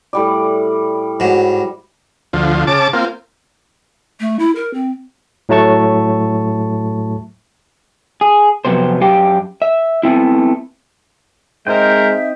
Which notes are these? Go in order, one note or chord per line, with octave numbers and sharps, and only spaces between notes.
A2 G3 D5
G#2 F#3
D2 F3
C#3 A5 D6
A#3 C4 F4
A3
E4
A#4
C4
A2 F#3 A3 A5 C#6
G#4
F2 C3 F#3 B3 C5
F#2 G4 F5 G5
E5
A3 B3 C4 E4
G#3 C4 D#4 A#4 C5 E5 G5